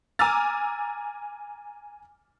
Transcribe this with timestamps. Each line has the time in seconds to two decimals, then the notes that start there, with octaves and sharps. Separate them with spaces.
0.19 G#5 A#5 D6 E6 F6 A6